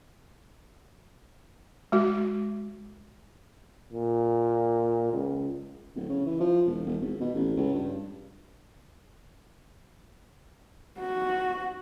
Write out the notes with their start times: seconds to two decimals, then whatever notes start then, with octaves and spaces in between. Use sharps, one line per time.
1.92 G#3 F#4
3.92 A#2
5.12 C#2
5.95 D1
6.09 C#3
6.26 E3
6.40 F3
6.66 E1
6.86 E1
7.01 G#1
7.20 B2
7.35 A1
7.57 C#2
7.74 G2
10.99 F#4